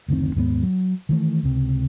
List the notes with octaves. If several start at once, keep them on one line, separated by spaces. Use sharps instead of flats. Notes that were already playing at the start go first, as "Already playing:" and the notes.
F#1 D2 D#3 C4
D#2 G#2 A#3 B3
F#3
D#3 E3 A3
C#2 C3